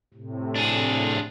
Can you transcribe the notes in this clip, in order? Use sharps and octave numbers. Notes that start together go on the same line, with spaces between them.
A2 C3
D4 G#4